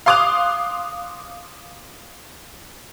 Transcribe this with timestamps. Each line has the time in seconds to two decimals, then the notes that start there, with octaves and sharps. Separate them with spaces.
0.06 F5 C6 D6 D#6 F#6 F7